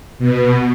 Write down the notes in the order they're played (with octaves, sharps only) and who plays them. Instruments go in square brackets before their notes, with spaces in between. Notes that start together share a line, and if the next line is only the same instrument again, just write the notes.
[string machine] B2